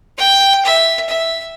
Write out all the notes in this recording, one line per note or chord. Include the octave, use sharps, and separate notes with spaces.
G5
E5
E5